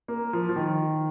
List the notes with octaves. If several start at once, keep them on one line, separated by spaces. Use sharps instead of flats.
A#3
F3
F3
D#3